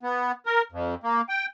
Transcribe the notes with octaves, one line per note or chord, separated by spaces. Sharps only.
B3
A#4
F2
A#3
G5